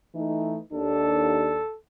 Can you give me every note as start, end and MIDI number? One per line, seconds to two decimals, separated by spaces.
0.14 0.57 52
0.14 0.57 57
0.14 0.57 63
0.72 1.60 39
0.72 1.60 62
0.72 1.77 69